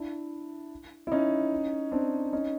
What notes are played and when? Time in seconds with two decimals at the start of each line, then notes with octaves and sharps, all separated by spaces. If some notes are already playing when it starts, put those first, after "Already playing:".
Already playing: D4 E4
1.07 E4
1.12 C#4 D#4
1.92 C4 D4
2.33 C#4 D#4